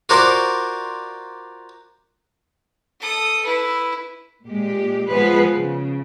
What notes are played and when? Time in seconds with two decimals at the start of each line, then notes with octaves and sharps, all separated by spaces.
0.09 F4 F#4 A#4 C5 D5
3.01 A4 D#6
3.45 E4 B4
4.44 A#2 G#3 G4
5.09 F3 G#3 B3 G#4 B4 C5
5.53 C#3